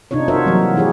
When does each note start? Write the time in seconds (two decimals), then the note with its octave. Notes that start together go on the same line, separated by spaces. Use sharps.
0.11 C3 D4 D#4 F4 C#5
0.28 F4 F#4 A#4 C5 C#5 E5
0.46 E3 F#3 G3 A#3 F#4
0.76 E3 E4 G4 G#4 C#5